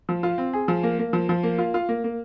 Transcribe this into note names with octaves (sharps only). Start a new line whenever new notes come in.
F3
F4
C4
G#4
F3
A#3
A#3
F3
F3
A#3
F4
F4
A#3
A#3